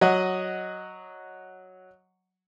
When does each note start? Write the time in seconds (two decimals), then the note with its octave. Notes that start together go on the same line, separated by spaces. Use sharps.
0.01 F#3 D#5 F#5